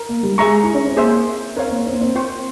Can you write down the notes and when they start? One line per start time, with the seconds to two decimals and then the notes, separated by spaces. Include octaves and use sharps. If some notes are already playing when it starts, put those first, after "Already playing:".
Already playing: A#4
0.09 A#3
0.23 G3
0.38 G#3 G#4 E5 A#5 C#6
0.63 E4
0.75 C#4
0.86 C4
0.97 A#3 G#4 C5 E5
1.56 C4 A#4 C#5 F5
1.67 C4
1.71 A#3
1.86 C4
1.93 A#3
2.01 C4
2.15 F4 C5 G5 C#6